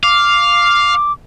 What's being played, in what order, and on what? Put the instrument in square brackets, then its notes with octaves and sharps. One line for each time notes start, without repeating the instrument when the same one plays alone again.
[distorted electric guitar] F5 [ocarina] D6